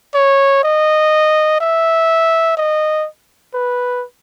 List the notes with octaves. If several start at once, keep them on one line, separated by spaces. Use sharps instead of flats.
C#5
D#5
E5
D#5
B4